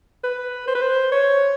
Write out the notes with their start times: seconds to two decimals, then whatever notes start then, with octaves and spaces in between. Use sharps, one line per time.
0.24 B4
0.67 C5
0.75 B4
0.81 C5
1.12 C#5